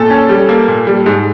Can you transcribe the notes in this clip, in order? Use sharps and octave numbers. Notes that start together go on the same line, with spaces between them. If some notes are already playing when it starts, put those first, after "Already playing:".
Already playing: A#2 A4
C#4
G3
A#3
A#2
G3
G#2